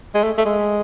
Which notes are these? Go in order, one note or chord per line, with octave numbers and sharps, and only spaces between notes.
G#3
A3
A3
G#3